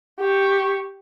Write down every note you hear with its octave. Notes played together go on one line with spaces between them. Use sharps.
G4 C#6